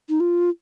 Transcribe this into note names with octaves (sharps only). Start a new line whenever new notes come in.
D#4
F4